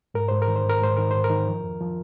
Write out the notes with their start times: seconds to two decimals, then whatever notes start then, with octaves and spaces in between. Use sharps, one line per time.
0.14 G#2 A#4
0.28 G#2 C5
0.42 A#4
0.48 D#3
0.56 C5
0.64 G#2
0.69 A#4
0.81 G#2 C5
0.97 D#3 A#4
1.11 G#2 C5
1.24 A#4
1.30 D#3
1.47 F3
1.64 F2
1.81 F3